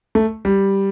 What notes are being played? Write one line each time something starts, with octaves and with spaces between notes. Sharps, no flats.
A3
G3